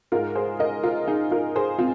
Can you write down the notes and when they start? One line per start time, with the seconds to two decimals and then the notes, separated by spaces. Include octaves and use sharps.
0.12 G#2 G#3 F4 A#4
0.35 G#4 C5
0.59 A#4 D#5
0.83 F4 A#4
1.08 D#4 G#4
1.31 F4 A#4
1.56 G#4 C5
1.78 C4 F4